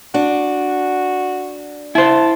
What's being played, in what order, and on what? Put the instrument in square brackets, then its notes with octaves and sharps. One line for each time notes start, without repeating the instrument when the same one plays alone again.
[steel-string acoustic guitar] D4 [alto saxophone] F#4
[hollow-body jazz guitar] E4 C5 [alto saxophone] A5